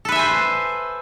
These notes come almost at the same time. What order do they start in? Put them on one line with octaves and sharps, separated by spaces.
A4 B4 E5 G#5 C5